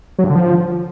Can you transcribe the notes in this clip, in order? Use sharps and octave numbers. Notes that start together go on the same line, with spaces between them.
F#3
G2
D3
F3